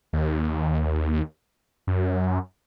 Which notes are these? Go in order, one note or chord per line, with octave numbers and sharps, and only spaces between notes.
D#2
F#2